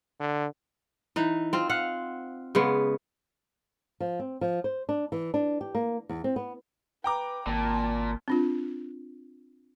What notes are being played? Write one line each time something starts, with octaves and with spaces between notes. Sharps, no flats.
D3
E3 D#4
C4 F4
F4 F5 F#5
C#3 G#3 B3
F3
C4
F3
C5
D4
E3
D4
G4
A#3
E2
C4
B3
B4 G5 A#5 D6
G#1 A#2 A5
C4 D4 F4